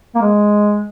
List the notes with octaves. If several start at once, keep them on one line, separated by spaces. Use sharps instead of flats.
A#3
G#3